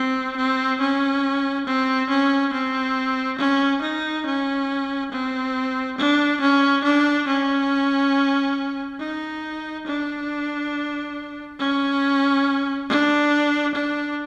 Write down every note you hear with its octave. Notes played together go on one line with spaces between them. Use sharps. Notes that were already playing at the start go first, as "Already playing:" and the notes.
Already playing: C4
C4
C#4
C4
C#4
C4
C#4
D#4
C#4
C4
D4
C#4
D4
C#4
D#4
D4
C#4
D4
D4